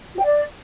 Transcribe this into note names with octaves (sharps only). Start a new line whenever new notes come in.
F#4
G5
D5